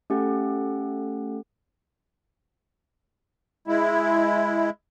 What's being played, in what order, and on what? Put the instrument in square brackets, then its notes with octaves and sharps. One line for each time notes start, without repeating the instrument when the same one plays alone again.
[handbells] A3 C#4 G4 A4 F#5
[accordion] G#3 E4